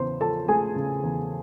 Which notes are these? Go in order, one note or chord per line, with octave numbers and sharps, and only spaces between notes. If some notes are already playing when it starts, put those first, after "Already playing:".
Already playing: E2 C#3 C5 C6
F3 A4 A5
A3 G#4 G#5
C#3
E2